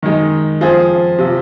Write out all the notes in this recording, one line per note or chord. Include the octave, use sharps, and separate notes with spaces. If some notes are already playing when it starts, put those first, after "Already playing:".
D#3 G#3 D#4
F3 C4 F4 G#4 C5
C3 F3 C4